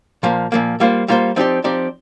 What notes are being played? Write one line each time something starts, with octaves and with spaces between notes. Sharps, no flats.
A#2 F3 A#3
A#2 F3 A#3
G3 A#3 F4 C5
G3 A#3 F4 C5
F3 C4 D#4 G4 D5
F3 C4 D#4 G4 D5